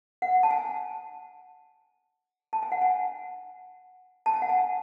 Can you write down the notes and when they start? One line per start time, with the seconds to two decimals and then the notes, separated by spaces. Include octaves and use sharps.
0.22 F#5
0.43 A5
0.51 G#5
2.53 A5
2.63 G#5
2.72 F#5
2.82 G#5
4.26 A5
4.34 G#5
4.42 F#5
4.49 G#5